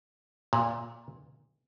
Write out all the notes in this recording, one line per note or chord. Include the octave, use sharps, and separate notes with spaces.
A#2